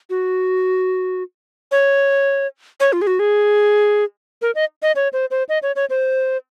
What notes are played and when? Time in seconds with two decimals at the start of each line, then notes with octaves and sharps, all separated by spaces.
0.10 F#4
1.72 C#5
2.80 C#5
2.93 F4
3.02 G#4
3.07 F#4
3.19 G#4
4.42 A#4
4.55 D#5
4.82 D#5
4.96 C#5
5.13 C5
5.31 C5
5.49 D#5
5.63 C#5
5.76 C#5
5.90 C5